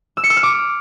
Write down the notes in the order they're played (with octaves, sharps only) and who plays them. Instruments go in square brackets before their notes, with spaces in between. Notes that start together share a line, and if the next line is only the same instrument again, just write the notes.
[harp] E6
C#7
E6
F6
D6